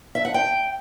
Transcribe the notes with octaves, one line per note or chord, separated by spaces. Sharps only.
E5
F#5
G5